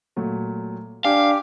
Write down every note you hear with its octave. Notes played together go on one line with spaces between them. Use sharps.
A#2 F#3 A3
D4 G4 F5 G#5 D6 F6